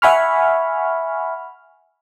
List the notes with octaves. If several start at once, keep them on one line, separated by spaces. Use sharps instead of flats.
E5 F#5 G#5 B5 C#6 F6